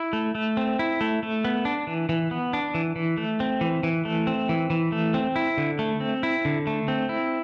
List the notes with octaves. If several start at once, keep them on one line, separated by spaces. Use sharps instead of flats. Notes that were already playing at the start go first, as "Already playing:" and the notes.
Already playing: E4
A3
A3
C4
E4
A3
A3
B3
D4
E3
E3
B3
D4
E3
E3
A3
C4
E3
E3
A3
C4
E3
E3
A3
C4
E4
D3
A3
C4
E4
D3
A3
C4
E4